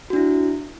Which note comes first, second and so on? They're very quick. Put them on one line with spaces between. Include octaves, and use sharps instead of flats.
F#4 D4 E4